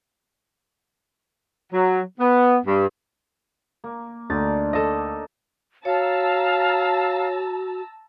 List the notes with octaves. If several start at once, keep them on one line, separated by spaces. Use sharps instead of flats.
F#3
B3
G2
A#3
D2 D4 D#4 A6
A4 D#5
F#4 C#5 F5 A5 A#5 E6